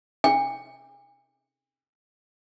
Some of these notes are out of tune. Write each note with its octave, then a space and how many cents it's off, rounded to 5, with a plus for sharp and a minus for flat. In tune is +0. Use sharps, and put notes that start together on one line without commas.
G#5 -45